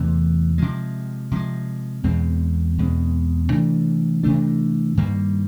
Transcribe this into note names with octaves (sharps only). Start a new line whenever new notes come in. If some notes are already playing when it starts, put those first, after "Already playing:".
Already playing: E2 C3 E3 A3
C3 F3 G#3
C3 F3 G#3
E2 B2 G#3 C4
E2 B2 G#3 C4
C3 E3 A3 D4
C3 E3 A3 D4
G2 D#3 G3 A#3